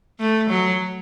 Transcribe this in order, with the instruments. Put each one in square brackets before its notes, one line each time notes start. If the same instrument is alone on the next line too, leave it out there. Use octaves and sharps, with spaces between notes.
[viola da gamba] A3
F#3